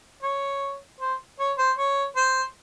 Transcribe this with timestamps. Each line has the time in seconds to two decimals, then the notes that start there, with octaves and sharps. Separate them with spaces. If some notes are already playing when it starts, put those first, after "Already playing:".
0.23 C#5
1.00 C5
1.39 C#5
1.58 C5
1.78 C#5
2.16 C5